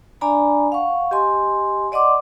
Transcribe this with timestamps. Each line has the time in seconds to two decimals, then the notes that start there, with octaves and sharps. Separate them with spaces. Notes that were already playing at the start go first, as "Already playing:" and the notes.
0.21 D4 D5 G#5 A#5 B5
0.72 F5 F#5 C#6
1.11 G4 D#5 G#5 C6
1.92 D5 D#5 F#5 C6 D6